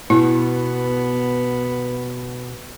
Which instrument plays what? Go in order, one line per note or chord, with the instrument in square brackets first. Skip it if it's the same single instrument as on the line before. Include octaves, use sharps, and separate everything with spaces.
[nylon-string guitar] B2 [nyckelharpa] B3 [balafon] E4